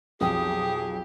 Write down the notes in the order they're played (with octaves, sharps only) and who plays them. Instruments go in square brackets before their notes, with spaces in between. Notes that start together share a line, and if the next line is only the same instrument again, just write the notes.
[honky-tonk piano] B1 F2 G5 [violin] G4 [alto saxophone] G#4 [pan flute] D#6